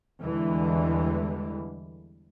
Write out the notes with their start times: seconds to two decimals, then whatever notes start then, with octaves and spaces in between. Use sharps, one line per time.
0.22 E2 D3 E3 G3 G#3